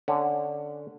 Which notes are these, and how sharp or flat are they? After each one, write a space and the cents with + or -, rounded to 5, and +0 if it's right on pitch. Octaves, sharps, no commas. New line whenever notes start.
D3 +0 C#4 +0